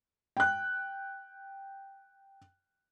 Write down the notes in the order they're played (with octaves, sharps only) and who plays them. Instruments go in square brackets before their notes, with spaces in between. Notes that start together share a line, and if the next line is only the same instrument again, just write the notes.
[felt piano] G5 F#6